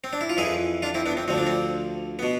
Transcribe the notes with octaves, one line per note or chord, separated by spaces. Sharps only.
C4
D4
E4
F4
F2 E3 E4 G#4
D4 F4
C4 E4
B3 D4
C4
D2 D3 F3 C4
D4
C4
B2 B3